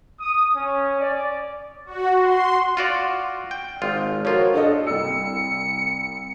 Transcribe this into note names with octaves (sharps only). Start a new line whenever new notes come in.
D#6
C#4
D5
F#4
C6
F4 F#4 D5
G5
G#1 F4
F3 F4 F#4 A#4 C#5
D4 A4 D#5
C2 E6 C#7